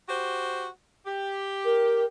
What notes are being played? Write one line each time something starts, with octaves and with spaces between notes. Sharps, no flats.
F#4 G4 C5
G4
A#4